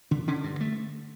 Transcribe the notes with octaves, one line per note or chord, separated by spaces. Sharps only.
D3 D4
D3 C#4
G2
A3